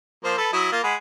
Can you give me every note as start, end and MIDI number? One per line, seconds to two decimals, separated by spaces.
0.24 0.34 53
0.24 0.34 58
0.24 0.34 72
0.38 0.51 69
0.38 0.51 71
0.53 0.69 54
0.53 0.69 64
0.53 0.69 87
0.72 0.82 58
0.72 0.82 65
0.83 0.95 56
0.83 0.95 78
0.83 0.95 83